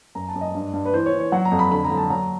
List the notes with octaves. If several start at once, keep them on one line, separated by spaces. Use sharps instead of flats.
F#2 A#5
A5
F#2
D#5
G2
G2
B4
E3 C5
C#5
E3
C#5
F#3 F#5
A#5
F2
B5
D3 B5
A#5
F#3
A5
F#3 A#5